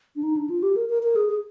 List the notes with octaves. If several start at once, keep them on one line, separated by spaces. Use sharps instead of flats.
D4
D#4
D4
F4
G4
A#4
A#4
A#4
G#4
G#4